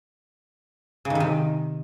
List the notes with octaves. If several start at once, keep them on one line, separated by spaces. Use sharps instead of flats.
C#3
D#3
C3
D#3